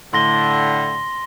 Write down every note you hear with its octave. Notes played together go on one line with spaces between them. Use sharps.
A2 D3 C6 A#6 G7